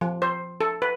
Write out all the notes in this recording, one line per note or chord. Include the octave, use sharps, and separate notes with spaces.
F3
C5
A4
B4